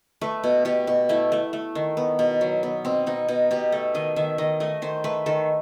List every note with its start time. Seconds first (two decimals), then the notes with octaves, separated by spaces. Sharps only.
0.21 A3 B4
0.44 B2
0.65 B2 G4
0.87 B2
1.09 A3 E4
1.32 A3
1.53 A3
1.75 D#3
1.97 B3
2.19 B2
2.41 F#3
2.63 B3
2.85 B2 C4
3.06 B2 D#4
3.28 B2 D#4
3.51 B2 G4
3.72 A3 A4
3.94 D#3 D#5
4.16 D#3 E5
4.38 D#3 D#5
4.60 A3 D#5
4.82 D#3 C5
5.04 A3 B4
5.26 D#3 A4